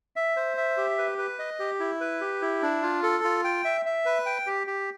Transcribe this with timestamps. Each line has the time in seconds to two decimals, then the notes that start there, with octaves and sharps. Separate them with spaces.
0.16 E5
0.36 C5
0.57 E5
0.77 G4
0.98 B4
1.18 B4
1.39 D#5
1.59 G4
1.80 E4
2.01 B4
2.21 G4
2.42 E4
2.62 D4
2.82 F4
3.03 A4
3.24 F4
3.44 G5
3.65 E5
3.85 E5
4.05 B4
4.26 G5
4.47 G4
4.67 G4